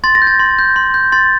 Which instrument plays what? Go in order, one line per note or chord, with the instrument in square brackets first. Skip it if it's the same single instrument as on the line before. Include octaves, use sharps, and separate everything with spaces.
[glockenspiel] C6 A6
A#6
G6
A6
C6
G6
C6
G6
C6 A6